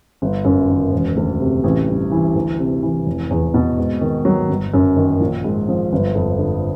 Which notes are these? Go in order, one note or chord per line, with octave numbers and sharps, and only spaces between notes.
G1
F#2
D#3
E1
D2
C3
A1
G2
E3
D2
C3
E3
F1
E2
B2
G#2
D#3
F#3
G1
F#2
D#3
A#1
G#2
F3
G1
F2
D3